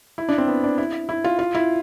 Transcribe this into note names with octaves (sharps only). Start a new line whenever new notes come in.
E4
D4
C4
B3
D4
E4
E4
F4
F4
E4